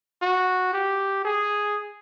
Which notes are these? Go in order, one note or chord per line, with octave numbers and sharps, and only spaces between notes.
F#4
G4
G#4